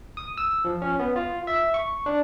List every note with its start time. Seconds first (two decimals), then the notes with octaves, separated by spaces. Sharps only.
0.17 D#6
0.38 E6
0.65 F3
0.82 C#4
0.99 B3
1.16 F4
1.47 E5
1.74 C#6
2.06 D4